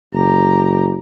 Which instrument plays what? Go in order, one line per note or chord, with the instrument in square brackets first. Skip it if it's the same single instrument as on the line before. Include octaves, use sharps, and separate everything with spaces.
[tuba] F#1 [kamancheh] G4 A#5